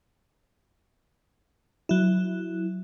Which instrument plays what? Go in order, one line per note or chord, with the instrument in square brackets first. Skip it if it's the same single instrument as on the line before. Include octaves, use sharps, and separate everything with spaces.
[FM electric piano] F#3 E4